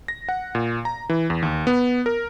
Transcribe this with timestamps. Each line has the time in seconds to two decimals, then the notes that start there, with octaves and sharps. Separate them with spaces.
0.08 A#6
0.29 F#5
0.55 A#2
0.85 A#5
1.09 E3
1.30 E2
1.42 D#2
1.67 B3
2.06 A#4